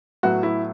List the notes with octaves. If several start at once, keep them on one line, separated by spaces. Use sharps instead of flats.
A2 F#3 B3 F#4
E4